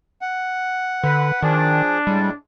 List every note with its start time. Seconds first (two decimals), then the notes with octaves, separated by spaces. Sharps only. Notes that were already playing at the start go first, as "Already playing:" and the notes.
0.21 F#5
1.04 D3 B4
1.43 D#3 F3 D4 G#4
2.07 A2 G3 G#3